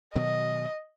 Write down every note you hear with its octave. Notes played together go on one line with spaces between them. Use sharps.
B2 D#3 F#3 D#5